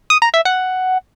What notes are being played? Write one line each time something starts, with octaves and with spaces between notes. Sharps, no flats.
D#6
A#5
E5
F#5